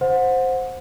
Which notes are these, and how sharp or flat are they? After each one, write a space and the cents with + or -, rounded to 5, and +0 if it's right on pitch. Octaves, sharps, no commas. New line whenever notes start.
C5 +0 F#5 -25